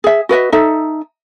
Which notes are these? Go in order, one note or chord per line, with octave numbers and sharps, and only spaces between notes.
G#4 E5
F#4 B4 D#5 E5
D#4 A4 E5